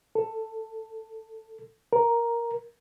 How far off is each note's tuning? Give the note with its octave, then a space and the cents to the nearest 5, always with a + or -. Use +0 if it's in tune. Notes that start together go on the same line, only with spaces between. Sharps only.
A4 +10
A#4 +5